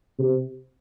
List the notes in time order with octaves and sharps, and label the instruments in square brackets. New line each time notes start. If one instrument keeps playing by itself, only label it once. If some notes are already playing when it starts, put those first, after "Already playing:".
[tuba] C3